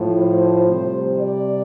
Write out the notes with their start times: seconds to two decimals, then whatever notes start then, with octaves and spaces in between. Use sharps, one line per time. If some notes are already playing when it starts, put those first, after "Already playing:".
Already playing: A2 F3
0.18 C5
0.68 C3 G3
1.19 D5